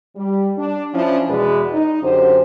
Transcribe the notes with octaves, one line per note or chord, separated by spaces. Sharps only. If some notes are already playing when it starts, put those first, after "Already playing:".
G3
D4
F3 C#4 D4 E4
E2 B2 G#3 B4 D5
D#4
F#2 D3 G4 C5